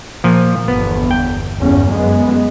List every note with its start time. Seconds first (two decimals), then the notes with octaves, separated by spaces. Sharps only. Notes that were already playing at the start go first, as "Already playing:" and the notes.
0.24 A#2 F3
0.68 G1 E2 B3
1.11 G5
1.60 G1 E2 C#4
1.91 F#2 G#3 B3